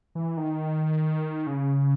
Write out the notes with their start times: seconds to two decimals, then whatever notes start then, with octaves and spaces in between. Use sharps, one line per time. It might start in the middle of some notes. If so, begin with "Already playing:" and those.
0.15 E3
0.37 D#3
1.47 C#3